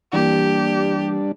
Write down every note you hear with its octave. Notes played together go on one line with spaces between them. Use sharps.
E3 G3 A#3 D4 G4